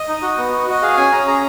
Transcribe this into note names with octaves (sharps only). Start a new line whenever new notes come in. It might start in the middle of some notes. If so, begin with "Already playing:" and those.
Already playing: D#5
D#4
F#4
B3
F#4
F#4 D#5
G#4 F5
C#4 G#5
C#4 A#5
G#4 A#5